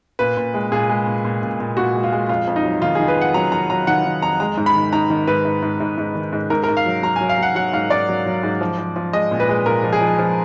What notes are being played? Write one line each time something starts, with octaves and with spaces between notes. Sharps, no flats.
A#2 B4
A#2
G#3
A#2 G#4
G#3
A#2
A#2
A#2
A#2
A#2 F#4
G#3
F4
G#3
F2 F4
F2
D#4
F#3
D#3 F4
G#4
D#3
B4
F2 F#5
F#3 A#5
D#3 A#5
F#3 A#5
D#3 F#5
D#3
F2 A#5
G#3 A#5
G#2
B5
D#3
G#2 A#5
D#3
G#2 B4
G#2
G#2
G#2
G#2
D#3
G#2
G#2 A#4
A#4
G#2
F5
F#3
F#3 A#5
G#5
F#3
F5
F#3 F#5
F#3 F#5
G#2 F5
G#2 D5
F#3
F#3
G#2
F3
F3
F3
G#3 D#5
A#2
B4
G#3
A#2 A#4
F3
G#4
F3
F3